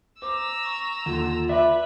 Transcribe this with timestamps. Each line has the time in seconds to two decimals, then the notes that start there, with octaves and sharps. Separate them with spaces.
0.22 C5 A#5 D6 E6
0.65 C#6
1.06 D#2 D3 F4
1.49 B4 D5 E5 D6